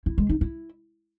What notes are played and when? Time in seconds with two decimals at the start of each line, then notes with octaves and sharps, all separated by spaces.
0.06 E4
0.18 G#3
0.29 D#4
0.41 E4